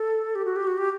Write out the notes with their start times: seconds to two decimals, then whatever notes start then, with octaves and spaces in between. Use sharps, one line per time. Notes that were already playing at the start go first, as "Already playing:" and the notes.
Already playing: A4
0.35 G4
0.45 F#4
0.56 G4
0.67 F#4
0.78 G4